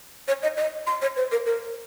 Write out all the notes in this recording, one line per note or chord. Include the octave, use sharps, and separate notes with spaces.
C#5
D#5
D#5
C6
C#5
C5
A#4
A#4